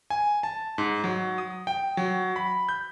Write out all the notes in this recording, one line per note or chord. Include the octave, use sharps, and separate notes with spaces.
G#5
A5
G#2
F#3
D#6
G5
F#3
B5
G6